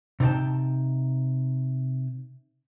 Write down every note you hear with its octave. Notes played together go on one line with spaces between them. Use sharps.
C3 D#4 D5 G5 A5